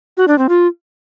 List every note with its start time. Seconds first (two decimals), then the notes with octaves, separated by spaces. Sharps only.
0.17 F#4
0.28 D4
0.38 C4
0.49 F4